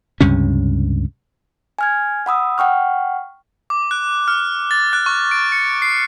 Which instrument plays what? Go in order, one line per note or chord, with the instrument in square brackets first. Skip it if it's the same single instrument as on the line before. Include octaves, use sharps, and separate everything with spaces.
[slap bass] C#2 G2 C3 C#4
[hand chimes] G#5 F6 G#6
F#5 B5 D#6 E6
F#5 G5 C#6 F6
[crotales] D6
F#6
F6
A6
F#6
C#6
D7
C#7
C7